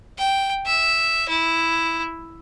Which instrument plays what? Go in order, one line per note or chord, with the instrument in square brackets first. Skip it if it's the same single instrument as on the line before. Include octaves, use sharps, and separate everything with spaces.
[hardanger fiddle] G5
E5
E4